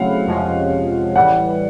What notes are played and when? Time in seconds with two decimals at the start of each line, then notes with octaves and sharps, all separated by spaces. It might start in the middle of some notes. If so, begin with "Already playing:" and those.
Already playing: C#3 F#3 A3 C4 E4 F5 F#5
0.27 F2 C3 F3 G#3 C#4
1.16 A2 E3 G3 F#5